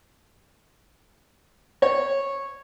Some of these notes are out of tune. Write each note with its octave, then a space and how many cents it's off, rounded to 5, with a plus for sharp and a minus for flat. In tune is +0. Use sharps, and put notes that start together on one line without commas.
C#5 -10